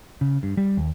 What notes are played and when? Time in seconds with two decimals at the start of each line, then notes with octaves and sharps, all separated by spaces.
0.21 C#3
0.43 G2
0.57 G3
0.77 D#2